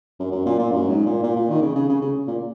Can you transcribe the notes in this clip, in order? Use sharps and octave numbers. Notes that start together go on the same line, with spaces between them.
F#2
F#2
A#2
A#2
F#2
G#2
A#2
A#2
A#2
D#3
C#3
C#3
C#3
C#3
A#2